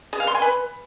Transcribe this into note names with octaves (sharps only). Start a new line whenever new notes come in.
G#4
F5
C6
G#5
B4